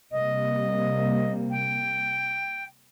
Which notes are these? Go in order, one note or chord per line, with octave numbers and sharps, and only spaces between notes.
C3 G3 A#3 D#5
G5